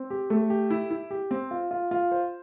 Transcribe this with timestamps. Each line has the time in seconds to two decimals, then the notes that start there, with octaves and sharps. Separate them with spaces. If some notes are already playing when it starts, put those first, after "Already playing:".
Already playing: C4
0.10 G4
0.30 A3
0.50 G4
0.70 E4
0.90 E4
1.11 G4
1.31 C4
1.51 F4
1.71 F4
1.91 F4
2.11 C5